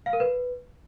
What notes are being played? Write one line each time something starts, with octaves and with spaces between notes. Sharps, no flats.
F5
A#4
B4